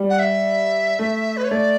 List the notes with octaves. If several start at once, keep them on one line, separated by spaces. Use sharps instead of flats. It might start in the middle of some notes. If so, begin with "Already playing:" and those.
Already playing: G3
F#5
E5
A3
B4
C#5
A3 D5